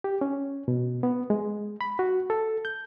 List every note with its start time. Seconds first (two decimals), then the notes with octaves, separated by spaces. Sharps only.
0.04 G4
0.21 C#4
0.68 B2
1.03 B3
1.30 G#3
1.81 B5
1.99 F#4
2.30 A4
2.65 G6